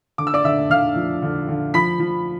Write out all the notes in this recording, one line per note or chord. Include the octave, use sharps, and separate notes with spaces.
D3 D6
E6
D5 D6
D3 E5 E6
D3 F5 F6
F3
D3
D3
F3 B5 B6
F3